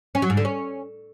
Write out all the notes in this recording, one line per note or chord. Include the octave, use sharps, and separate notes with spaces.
C#4
F#3
G#2
D3
C#4